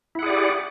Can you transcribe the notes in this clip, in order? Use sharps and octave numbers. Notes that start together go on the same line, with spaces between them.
E4 G4 G#4 D5 F#5